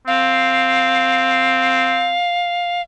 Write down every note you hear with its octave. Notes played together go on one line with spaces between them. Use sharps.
C4 F5